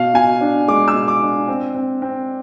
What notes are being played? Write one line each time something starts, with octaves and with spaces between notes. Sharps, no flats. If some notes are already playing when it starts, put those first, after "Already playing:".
Already playing: B2 F5
B2 G#5
D4
G#3 D6
E6
B2
D6
D4
C4
C4
C4